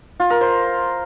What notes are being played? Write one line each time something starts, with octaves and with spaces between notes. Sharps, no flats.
F4
A#4
C5